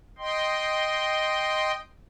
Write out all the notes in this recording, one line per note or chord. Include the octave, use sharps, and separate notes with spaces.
D#5 G5 C6